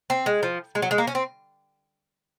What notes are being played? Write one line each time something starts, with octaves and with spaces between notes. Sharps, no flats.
C4
G#3
F3
G#3
F#3
G#3
A#3
C#4
C4